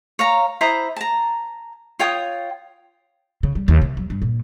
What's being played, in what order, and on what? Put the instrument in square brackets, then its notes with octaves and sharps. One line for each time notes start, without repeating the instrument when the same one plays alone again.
[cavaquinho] C#5 F5 A#5
E4 C5 A#5 D#6
A5 A#5
F4 C#5 G5 D#6
[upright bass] C#3
G3
D#2
C3
F#3
G2
A#2